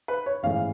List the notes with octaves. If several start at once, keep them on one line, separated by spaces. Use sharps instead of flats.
B4
C#5
A1 G#2 E3 A3 F5